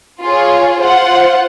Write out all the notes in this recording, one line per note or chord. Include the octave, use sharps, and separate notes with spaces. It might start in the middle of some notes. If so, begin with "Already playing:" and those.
F4 G#4 C#5
F4 C5 F#5